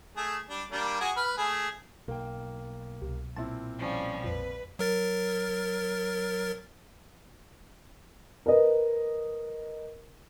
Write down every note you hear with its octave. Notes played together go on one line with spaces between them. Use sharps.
A3 G#4
G3 D4
G3 A#3 D4
F#4 G#4 G#5
B4 F6
A3 G#4
B1 A#3 G5
C2
A#2 C4 E4 A5
F3 G3 C#4
A#1 F2 B4
F#3 A#4 A6
A#4 B4 D#5